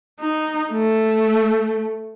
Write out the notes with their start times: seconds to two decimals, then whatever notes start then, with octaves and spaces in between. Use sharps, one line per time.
0.20 D#4
0.72 A3